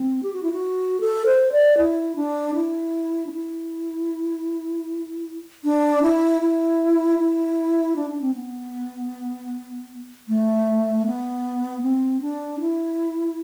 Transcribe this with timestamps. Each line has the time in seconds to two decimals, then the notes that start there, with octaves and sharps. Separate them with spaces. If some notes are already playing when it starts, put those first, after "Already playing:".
Already playing: C4
0.23 G4
0.33 F#4
0.43 E4
0.52 F#4
1.01 A4
1.26 C5
1.52 D5
1.77 E4
2.16 D4
2.54 E4
3.27 D4
3.32 E4
5.64 D4
6.02 E4
6.41 E4
7.19 E4
7.96 D4
8.10 D4
8.22 C4
8.35 B3
10.28 A3
11.06 B3
11.82 C4
12.21 D4
12.60 E4